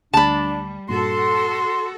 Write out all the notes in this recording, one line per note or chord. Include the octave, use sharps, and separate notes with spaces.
D2 G3 D4 A5 B5
G2 A#2 F#4 A4 C6